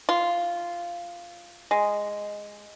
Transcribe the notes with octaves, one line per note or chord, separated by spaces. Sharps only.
F4
G#3